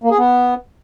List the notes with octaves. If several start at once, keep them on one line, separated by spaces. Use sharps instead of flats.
A#3
G#4
B3